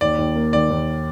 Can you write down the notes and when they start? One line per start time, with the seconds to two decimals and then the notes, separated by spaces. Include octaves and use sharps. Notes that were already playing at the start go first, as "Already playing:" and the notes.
0.01 D#2 D5
0.18 D#2
0.35 A#3
0.53 D#3 D5
0.70 D#2